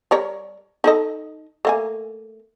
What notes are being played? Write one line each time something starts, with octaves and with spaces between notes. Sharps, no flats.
G3 A#4 C#5
D#4 A4 D#5
A3 A#3 G#5